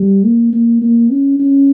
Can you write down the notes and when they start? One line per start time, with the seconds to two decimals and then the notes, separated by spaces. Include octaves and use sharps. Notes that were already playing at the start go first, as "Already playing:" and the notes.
Already playing: G3
0.24 A#3
0.53 A#3
0.82 A#3
1.11 C#4
1.39 C#4